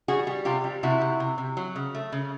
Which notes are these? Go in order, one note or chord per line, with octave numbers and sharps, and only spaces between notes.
G3 F#4 G#4
G3
C3 F4 G4
G3
C3 E4 F#4
C3
C3
C3
F#3
C#3
A3
C#3